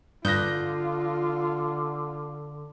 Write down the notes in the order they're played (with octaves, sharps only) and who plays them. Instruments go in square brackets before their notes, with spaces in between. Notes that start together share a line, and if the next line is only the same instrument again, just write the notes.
[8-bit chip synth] G2 G6 [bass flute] D3 [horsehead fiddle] F4 [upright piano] D#6 F#6 A#6